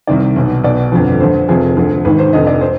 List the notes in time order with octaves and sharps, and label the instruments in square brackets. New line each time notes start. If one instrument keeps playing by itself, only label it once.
[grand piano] C2 C3 D#3 D5
B1 B2
B1 B2 D5
G1 F2 D3 F3
D2 D3 F3 C5
F1 F2 C3 F3 G#4
D2 D3 F3
G#1 G#2 D#3 B4
C5
F1 F2 D3 D#5
D5
C5